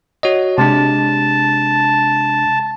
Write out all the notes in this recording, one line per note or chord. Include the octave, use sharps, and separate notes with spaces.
F#4 C#5 D#5
C3 G#3 D4 A5